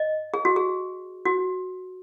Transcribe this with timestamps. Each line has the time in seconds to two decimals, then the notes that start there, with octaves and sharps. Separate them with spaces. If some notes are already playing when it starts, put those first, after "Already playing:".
Already playing: D#5
0.34 G#4
0.45 F#4
0.56 G#4
1.25 F#4